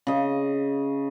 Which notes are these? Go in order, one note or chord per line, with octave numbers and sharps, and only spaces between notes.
C#3 D#5